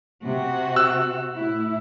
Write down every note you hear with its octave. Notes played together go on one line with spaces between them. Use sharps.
C3 F#4
E6 F#6
A2 E4